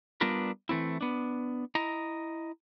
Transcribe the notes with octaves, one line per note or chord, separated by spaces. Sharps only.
G3 B3 D4 F4 A#4 B4
E3 A3 C4 E4
B3 D4
E4 D#5 A#5